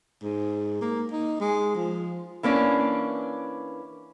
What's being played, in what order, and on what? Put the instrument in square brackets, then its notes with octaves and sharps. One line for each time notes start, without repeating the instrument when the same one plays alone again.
[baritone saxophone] G#2
A#3
D#4
G#3
F3
[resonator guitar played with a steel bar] E3 A#3 C#4 D4